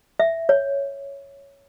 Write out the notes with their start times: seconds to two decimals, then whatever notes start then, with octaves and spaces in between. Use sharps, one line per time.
0.19 E5
0.49 C#5